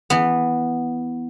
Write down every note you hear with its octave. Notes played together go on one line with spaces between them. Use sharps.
E3 B3